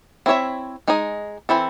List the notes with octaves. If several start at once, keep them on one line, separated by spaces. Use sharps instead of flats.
C4 E4 G#4 C#5 E5
G#3 D#4 G#4 D#5
E3 C4 E4 A4